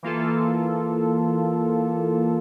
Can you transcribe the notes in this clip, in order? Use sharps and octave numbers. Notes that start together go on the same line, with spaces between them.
E3 A#3 F4 A4